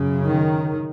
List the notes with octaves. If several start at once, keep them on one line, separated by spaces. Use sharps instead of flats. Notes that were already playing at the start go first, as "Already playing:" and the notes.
Already playing: F#2 C#3
D#3